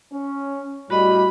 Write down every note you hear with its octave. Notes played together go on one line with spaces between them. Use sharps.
C#4
A2 G3 F#4 D#5 B5